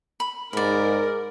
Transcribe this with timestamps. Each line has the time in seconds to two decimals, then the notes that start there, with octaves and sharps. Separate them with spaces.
0.20 B5
0.53 G#2 A#4 D5 B5